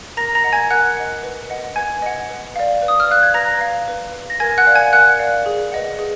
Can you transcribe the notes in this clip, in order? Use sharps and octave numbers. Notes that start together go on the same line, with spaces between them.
A#4 A#5 A#6
A#5 A#6
D#5 F#5
G#5 G#6
A#4 F#5 F#6
D#5 F#5
B4
D#5 F#5
B4 G#5 G#6
D#5 F#5
B4
D5 F5
B4
D#6
F6
D5 F5 F#6
G#6
B4 A#5 A#6
F5
B4
F5
A#6
A#4 G#5 G#6
F#5 F#6
D5 F5
G#5 G#6
A#4 F#5 F#6
D5 F5
G#4
B4 D#5 F#5
G#4